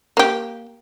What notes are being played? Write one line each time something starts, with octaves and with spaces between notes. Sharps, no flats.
A#3 G4